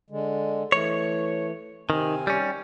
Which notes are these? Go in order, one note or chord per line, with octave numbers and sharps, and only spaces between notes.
D3 G#3
E3 A3 C#5
C3 D#3 C4 G#5
G3 C#4